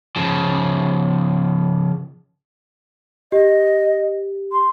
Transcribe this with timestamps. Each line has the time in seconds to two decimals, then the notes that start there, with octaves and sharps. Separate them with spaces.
0.16 C#3 F3
3.32 G4 D#5
4.52 C6